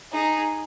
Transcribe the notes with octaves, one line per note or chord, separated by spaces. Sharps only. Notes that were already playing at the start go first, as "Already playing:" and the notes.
D#4 G#4